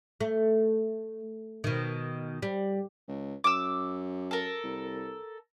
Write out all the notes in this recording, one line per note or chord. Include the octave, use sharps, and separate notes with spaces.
A3
B2 D#3
G3
C#2
F#2 D6 E6
A4 A#4
C2